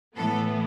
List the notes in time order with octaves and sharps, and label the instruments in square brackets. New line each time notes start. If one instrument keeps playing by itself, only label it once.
[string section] A2 E3 B3 A4